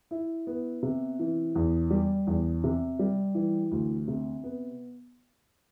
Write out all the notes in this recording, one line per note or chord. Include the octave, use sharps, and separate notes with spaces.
E4
B3
C3
E3
E2
G3
E2
C3
G3
E3
D2
C3
B3